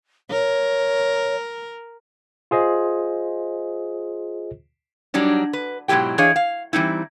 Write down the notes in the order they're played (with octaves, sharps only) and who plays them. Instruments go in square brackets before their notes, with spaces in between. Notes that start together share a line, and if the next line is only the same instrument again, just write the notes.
[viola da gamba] A#4 [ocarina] C#5
[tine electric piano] F4 G#4 C5 D#5
[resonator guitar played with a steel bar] F#3 G3 D4 D#4
B4
G#2 B2 F#3 E4 G4 G5
E3 D4 G#4 C#5 D#5 F5
F5
E3 G3 C4 D#4 E4